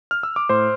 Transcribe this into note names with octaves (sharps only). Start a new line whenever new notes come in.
F6
E6
D6
A2 C5 C6